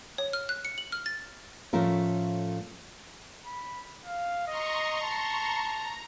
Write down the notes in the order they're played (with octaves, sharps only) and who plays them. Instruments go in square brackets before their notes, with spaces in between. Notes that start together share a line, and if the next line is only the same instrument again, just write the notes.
[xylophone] C#5
F6
F#6
C#7
F#7
F6
A6
[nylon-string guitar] A2 F3 A3 C#4 F4 A#4
[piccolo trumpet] B5
F5
[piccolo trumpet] D#5 [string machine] A#5 C6 C#6
[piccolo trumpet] A5
[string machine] A#5